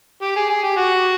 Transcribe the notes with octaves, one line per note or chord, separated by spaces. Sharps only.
G4
G#4
G#4
G4
F#4